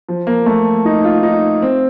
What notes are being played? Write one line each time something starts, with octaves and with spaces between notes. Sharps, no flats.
F3
A#3
A3
D#4
F4
D#4
C4